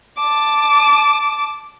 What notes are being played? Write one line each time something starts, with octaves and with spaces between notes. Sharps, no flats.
A5 D6